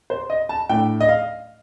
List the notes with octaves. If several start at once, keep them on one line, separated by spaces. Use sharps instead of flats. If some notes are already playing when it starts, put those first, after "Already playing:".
C5
D#5
A5
A2 A3 D4 G5
D#5
F5